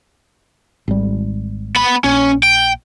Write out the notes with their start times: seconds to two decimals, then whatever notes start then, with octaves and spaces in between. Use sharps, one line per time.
0.88 G#1 G3
1.76 B3 B5
2.04 A#1 C#4
2.43 G5